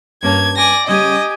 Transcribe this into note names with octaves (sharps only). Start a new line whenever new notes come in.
G2 A#3 C#4 A5 G#6
D5 G#5 A#6
C#3 G3 C#4 G4 D#5 G#5